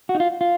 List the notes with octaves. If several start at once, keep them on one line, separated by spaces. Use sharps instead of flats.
F#4
D#4
F4
F4